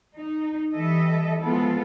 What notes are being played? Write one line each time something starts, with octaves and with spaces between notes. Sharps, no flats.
D#4
E3 G3 A4 D#5 E5
F3 G#3 B3 E4 F4 A4